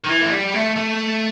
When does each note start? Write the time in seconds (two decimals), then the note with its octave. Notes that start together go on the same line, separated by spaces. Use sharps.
0.04 D#3
0.08 E3
0.21 A3
0.30 G3
0.54 A3
0.76 A3